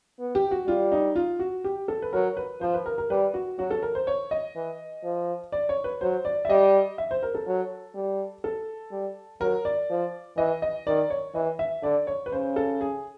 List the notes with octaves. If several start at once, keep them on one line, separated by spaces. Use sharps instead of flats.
B3
G4
F#4
G3 F4
D#4
F4
F#4
G4
A4
B4
F#3 A#4
B4
F3 C5
B4
A#4
A#4
G3 B4
F#4
F#3 F#4
A4
A#4
C5
C#5
D#5
E3
F3
D5
C#5
B4
F#3 C5
D5
E5
G3 D#5
E5
C5
A#4
A4
F#3
G3
A4
G3
F#3 A#4
D5
F3
E3 D#5
D#5
D#3 D5
C#5
E3 D#5
E5
D3 D5
C#5
B4
C#3 C5
A4
G#4